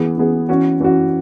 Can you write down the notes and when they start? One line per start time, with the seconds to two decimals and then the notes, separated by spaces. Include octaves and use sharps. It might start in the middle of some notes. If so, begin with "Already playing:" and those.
Already playing: E3 B3 G#4
0.17 E3 B3 G#4
0.49 E3 C#4 F#4
0.80 E3 C#4 F#4